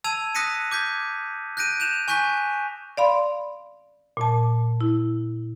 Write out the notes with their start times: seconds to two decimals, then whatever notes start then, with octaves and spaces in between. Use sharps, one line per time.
0.04 A5 E6 G#6 D#7 F7
0.35 D#6 F#6 A#6 B6 C#7 D#7
0.71 D6 G6 G#6 B6
1.57 F#6 G6 A#6 D7 D#7
1.80 G6 E7 F7
2.08 G#5 C#6 F#6 G6 B6
2.97 D5 F5 B5 C6
4.17 A#2 A5
4.81 E4